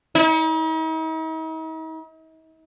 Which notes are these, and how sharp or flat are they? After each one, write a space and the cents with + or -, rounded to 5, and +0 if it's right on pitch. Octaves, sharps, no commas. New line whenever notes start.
D#4 +45